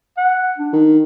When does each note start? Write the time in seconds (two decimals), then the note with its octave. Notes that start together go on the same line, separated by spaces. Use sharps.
0.17 F#5
0.58 D4
0.73 D#3